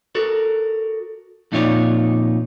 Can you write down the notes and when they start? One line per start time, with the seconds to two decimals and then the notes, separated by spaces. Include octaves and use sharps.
0.15 F#4 A4 A#4
1.52 F2 A#2 D#4 F4 C#5 D5